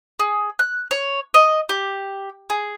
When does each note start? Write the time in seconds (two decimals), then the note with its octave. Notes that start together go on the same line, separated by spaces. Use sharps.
0.19 G#4
0.59 F#6
0.91 C#5
1.34 D#5
1.69 G4
2.50 G#4